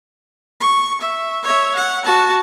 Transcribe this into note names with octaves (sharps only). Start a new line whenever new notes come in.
C#6
E5
C#5 E5
F#5
F#4 A5